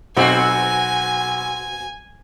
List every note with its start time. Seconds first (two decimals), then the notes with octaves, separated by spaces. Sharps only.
0.17 B1 B2 C4 F#4 G#5